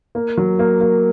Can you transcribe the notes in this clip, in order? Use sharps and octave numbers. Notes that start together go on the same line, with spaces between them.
A#3
F#3
A#3
A#3